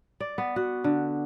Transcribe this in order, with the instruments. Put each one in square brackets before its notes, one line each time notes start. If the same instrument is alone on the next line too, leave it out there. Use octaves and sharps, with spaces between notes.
[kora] D5
B3
F#4
D3